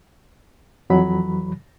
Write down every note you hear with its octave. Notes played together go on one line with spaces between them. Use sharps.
F2 E3 F#3 B5